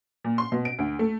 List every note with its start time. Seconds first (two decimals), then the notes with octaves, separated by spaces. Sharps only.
0.24 A#2
0.38 C6
0.52 B2
0.65 D7
0.79 D2
0.99 A3